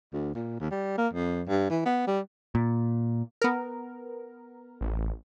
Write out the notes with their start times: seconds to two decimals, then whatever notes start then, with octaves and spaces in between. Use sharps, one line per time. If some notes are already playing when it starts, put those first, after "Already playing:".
0.13 D2
0.35 A#2
0.60 D#2
0.71 G3
0.98 A#3
1.13 F2
1.48 G2
1.70 E3
1.85 B3
2.07 G3
2.55 A#2
3.42 B3 A#4
4.81 A1